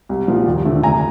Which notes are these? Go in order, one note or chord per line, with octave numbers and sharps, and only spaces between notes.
C2
A#2 F3
D#2
D3 F3 A3
F1 G#5 A#5